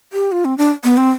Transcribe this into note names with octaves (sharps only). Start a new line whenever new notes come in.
G4
F4
C4
D4
B3
C4